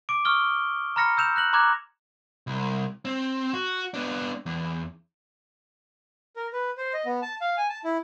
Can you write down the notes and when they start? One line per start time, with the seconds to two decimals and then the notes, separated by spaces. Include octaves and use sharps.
0.09 D6 D7
0.25 C#6 D#6 F6 G7
0.96 A#5 B5 F6 A#6 C#7
1.17 E6 G6 E7 F7
1.36 F#6 A#6 F#7
1.53 A#5 C6 D6 F#6 G#6
2.47 C2
3.05 C4
3.53 F#4
3.94 B3 D4
4.46 E2
6.36 A#4
6.53 B4
6.77 C5
6.93 D#5
7.05 B3
7.22 A5
7.41 F5
7.57 G#5
7.69 A5
7.84 E4